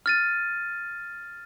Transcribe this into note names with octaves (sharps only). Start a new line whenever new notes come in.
F6 A6 D#7